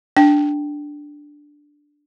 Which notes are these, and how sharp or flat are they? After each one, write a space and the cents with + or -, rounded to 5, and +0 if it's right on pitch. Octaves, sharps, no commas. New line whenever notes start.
D4 +0 G5 +0